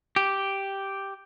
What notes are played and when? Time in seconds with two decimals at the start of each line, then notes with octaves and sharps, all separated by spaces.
0.16 G4